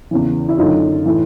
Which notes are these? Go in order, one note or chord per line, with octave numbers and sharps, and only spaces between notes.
E2 C#3 E3
E4
F#2 D3 D#4 F4
A2 E3